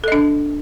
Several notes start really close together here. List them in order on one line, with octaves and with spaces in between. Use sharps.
A4 D#5 D4